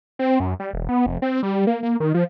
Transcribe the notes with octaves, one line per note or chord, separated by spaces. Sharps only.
C4
F#2
G3
E1
B3
F1
C4
G3
A#3
A#3
D#3
F3